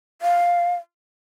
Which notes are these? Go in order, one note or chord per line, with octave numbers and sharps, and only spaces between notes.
F5